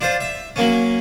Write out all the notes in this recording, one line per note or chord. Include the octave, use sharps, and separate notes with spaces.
D4 F4 C5
E5
F#3 A#3 C#4